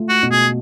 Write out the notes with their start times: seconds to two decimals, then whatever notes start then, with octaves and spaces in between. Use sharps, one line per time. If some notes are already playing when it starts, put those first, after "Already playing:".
Already playing: A3 F4
0.09 F#4
0.23 B2
0.31 G#4